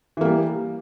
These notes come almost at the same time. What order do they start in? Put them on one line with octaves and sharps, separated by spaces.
E3 A#3 G3